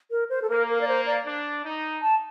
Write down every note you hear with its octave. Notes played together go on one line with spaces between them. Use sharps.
A#4
C5
A4
A#3 A#4
A#4
D5
C5
D5
D4
D#4
A5